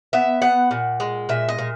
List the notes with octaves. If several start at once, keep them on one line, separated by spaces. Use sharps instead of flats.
B3 E5
B3 F#5
A#2
G#3
A#2 E5
D#5
A#2